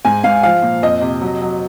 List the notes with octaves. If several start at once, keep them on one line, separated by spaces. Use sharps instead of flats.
G#2 G#5
G#2 F5
F3 F5
A#2
F2 D#5
C3
F#3
F#3